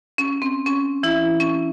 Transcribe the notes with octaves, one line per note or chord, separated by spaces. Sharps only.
C#4
C4
C#4
E3 E4
C#4